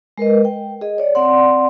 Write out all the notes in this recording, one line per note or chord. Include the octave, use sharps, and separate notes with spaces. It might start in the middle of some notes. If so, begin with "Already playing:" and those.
G#3 A#4 B4 D#5
G5
G#4 D#5
C#5 D5
C4 D5 F#5 C6